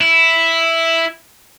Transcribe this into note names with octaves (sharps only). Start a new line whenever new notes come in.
E4